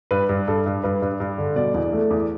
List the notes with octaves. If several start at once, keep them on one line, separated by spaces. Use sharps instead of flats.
G2 B4
G2
G2 A4
G2
G2 B4
G2
G2
D3
B2 D5
E2
A3
E2